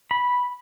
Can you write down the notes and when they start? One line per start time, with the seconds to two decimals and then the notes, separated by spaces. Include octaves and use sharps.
0.11 B5